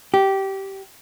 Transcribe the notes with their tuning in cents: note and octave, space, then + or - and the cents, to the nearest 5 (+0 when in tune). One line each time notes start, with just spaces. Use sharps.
G4 -15